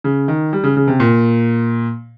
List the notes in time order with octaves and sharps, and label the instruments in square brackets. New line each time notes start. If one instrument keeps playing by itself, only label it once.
[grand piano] C#3
D#3
G3
C#3
C#3
C3
A#2